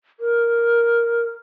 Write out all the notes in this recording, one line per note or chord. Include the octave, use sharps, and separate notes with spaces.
A#4